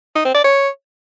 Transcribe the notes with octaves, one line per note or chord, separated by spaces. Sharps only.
D#4
C4
D5
C#5